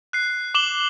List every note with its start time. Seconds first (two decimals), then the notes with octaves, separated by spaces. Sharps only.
0.13 F#6 C7
0.55 D6 E7 F#7 G7